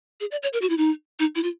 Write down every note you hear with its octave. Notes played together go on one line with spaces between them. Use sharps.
G#4
D5
C#5
A#4
F#4
E4
D#4
D#4
E4
F4